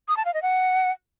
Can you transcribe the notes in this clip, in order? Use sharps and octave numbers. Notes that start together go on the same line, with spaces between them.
D#6
A5
F5
D#5
F#5